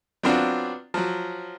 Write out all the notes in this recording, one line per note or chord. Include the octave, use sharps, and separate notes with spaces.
F#3 B3 C4 D4 F4 F#4
F3 F#3